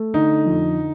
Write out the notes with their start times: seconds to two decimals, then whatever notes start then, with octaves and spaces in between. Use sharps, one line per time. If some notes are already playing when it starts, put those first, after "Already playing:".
Already playing: A3
0.14 D3 D#4
0.46 F2